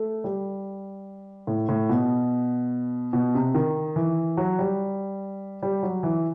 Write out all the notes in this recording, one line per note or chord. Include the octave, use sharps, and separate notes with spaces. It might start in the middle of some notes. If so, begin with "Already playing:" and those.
Already playing: A3
G3
A2
A2
B2
B2
C3
D#3
E3
F#3
G3
G3
F#3
E3